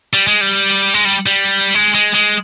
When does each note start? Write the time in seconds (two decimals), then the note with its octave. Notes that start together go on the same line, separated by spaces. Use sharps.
0.13 G3
0.27 G#3
0.41 G3
0.94 G#3
1.05 G3
1.26 G3
1.75 G#3
1.95 G#3
2.14 G#3